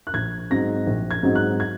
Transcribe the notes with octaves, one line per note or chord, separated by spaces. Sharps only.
F#6
A#1 G#6
G#2 F#3 C4 D#4 A#6
A#1
G#6
G#2 F#3 C4 D#4
F#6
G#6